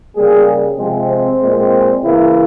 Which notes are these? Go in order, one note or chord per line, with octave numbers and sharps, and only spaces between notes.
C#3 G3 A#3 G#4
C3 F3 G#3 C4
C5
A#2 G#3 C4
C#3 E3 A#3 E4